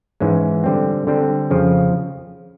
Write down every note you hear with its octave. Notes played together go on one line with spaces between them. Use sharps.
G#2 E3 G#3 C#4
D3 G3 C4
D3 G3 C4
F2 C#3 F3